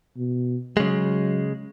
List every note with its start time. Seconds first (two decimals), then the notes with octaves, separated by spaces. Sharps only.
0.17 B2
0.77 C#3 F#3 G#3